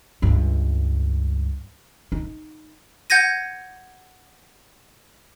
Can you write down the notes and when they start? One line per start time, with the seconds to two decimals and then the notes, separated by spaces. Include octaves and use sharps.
0.22 C#2 G2
2.12 D#4
3.10 F#5 G6 G#6 A#6 D#7